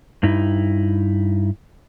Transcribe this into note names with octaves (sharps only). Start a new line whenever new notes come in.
G2 D#4 E4